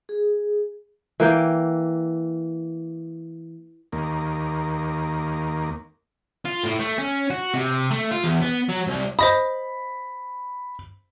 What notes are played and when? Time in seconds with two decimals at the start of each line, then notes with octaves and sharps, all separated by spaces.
0.09 G#4
1.20 E3 A#3 G5
3.92 D#2 A#3
6.45 F4
6.64 A2
6.79 A3
6.98 C#4
7.30 F#4
7.54 C3
7.91 A3
8.11 F4
8.24 E2
8.42 B3
8.69 F#3
8.87 C2
9.19 C5 D#5 B5 D#6